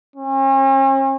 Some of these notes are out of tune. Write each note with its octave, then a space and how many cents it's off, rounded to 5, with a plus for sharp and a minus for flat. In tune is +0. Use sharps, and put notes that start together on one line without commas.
C#4 -45